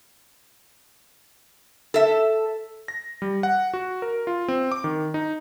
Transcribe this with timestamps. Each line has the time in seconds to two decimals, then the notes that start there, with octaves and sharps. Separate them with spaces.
1.94 A4 E5
2.88 A#6
3.22 G3
3.43 F#5
3.74 F#4
4.02 A#4
4.27 F4
4.48 C4
4.72 D6
4.84 D#3
5.14 D#4